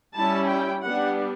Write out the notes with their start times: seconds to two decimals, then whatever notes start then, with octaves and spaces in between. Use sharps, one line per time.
0.16 G3 C#4 E4 A5
0.50 G5
0.84 G3 B3 D4 F#5